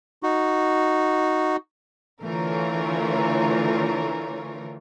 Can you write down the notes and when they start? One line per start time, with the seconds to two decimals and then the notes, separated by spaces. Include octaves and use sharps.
0.23 D#4 F#4
2.22 D3 E3 A3 F4 A#4 C#5